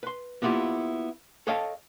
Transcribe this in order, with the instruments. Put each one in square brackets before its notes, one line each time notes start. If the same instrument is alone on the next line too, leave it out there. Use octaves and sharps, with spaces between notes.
[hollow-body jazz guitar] B4 C6
A#3 B3 E4 F4 G4
A4 C#5 D#5 F5 G5 A5